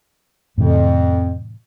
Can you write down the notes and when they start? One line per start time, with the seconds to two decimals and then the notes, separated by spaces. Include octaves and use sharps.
0.58 F2 A2 C3 E3